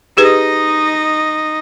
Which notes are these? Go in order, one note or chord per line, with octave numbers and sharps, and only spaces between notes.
D#4 G4 G#4 B4 D#5